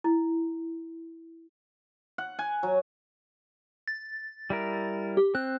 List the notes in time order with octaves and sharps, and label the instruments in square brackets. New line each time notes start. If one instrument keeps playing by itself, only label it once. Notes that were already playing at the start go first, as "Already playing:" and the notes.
[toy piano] E4
[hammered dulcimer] F#5
G#5
F#3
[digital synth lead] A6
[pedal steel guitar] G3 E4 A#4
[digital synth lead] G4
[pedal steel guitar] C4 [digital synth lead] F#6